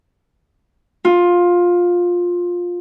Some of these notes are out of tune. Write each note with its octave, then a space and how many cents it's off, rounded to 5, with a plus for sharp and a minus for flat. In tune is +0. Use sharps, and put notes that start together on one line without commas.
F4 +15